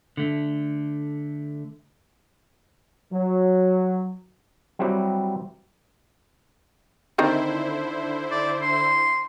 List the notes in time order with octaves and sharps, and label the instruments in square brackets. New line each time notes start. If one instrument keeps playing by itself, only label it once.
[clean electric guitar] D3 A3
[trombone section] F#3
[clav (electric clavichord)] F#3 G3 C4 E4 F#4 G4
[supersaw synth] D3 E4 C5 [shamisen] D#3 C4 D#4
[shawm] D5
C6